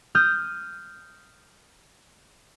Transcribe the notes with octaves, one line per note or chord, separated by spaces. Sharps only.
D#6 F6 G6